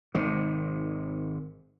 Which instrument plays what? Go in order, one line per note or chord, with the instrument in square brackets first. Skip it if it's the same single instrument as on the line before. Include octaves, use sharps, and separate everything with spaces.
[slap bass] G#1 C3 D#3